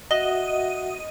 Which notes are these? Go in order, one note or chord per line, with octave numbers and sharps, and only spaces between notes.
F#4 D#5 E5 F#5